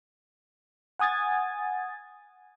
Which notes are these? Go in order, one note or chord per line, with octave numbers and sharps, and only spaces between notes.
F#5 G#5 D#6 G#6 A6